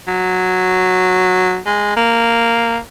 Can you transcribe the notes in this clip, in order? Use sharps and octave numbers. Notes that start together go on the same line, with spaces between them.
F#3
G#3
A#3